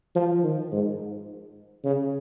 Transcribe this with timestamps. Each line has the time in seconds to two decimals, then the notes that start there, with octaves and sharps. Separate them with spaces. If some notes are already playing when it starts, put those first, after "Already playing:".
0.16 F3
0.43 D#3
0.72 G#2
1.84 C#3